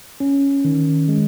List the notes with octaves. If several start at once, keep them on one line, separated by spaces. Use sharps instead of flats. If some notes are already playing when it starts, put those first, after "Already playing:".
C#4
D#3
G#3